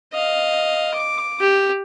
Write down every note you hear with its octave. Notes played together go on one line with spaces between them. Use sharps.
D#5 F5
D6
G4